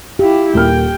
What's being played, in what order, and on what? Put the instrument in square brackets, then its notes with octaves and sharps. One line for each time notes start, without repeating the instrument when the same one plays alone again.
[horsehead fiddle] E4 F4 [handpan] G4
[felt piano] D#1 A#3 F6 [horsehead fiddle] G5